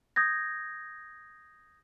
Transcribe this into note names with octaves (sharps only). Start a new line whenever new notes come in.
D#6 G6 G#6 A#6